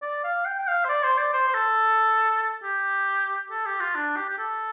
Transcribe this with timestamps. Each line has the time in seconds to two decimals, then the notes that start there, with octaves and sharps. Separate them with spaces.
0.02 D5
0.24 F5
0.46 G5
0.58 G5
0.68 F5
0.85 C5
0.89 D5
1.04 C5
1.18 D5
1.33 C5
1.48 C5
1.54 A4
2.64 G4
3.51 A4
3.66 G4
3.80 F4
3.95 D4
4.17 G4
4.29 G4
4.38 A4